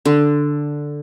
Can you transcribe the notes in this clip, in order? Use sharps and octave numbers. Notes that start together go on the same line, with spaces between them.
D3